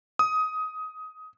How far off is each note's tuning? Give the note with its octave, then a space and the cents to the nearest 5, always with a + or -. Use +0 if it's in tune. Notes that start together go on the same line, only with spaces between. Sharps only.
D#6 +15